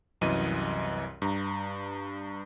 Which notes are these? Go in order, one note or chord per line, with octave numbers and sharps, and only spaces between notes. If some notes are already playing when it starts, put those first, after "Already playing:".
C2 F#2 E3 D#5 D#7
G2 A#5